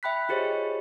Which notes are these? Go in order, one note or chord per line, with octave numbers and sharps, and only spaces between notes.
E5 G5 B5 F#6 B6
F4 G4 G#4 C5 C#5 D#5